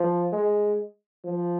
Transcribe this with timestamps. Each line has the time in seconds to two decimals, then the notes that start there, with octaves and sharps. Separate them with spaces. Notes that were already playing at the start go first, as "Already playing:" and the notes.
Already playing: F3
0.32 G#3
1.24 F3